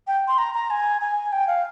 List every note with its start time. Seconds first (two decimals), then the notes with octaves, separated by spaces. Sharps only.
0.07 G5
0.28 C6
0.38 A#5
0.54 A#5
0.70 G#5
1.01 G#5
1.32 G5
1.47 F5